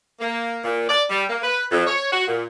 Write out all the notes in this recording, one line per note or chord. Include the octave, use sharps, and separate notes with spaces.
A#3
A#2
D5
G3
A#3
B4
F2
C#5
F#4
A#2